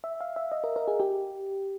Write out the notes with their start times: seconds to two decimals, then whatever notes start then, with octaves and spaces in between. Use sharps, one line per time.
0.04 E5
0.21 F5
0.36 E5
0.52 D#5
0.64 A#4
0.76 A#4
0.88 G#4
1.00 G4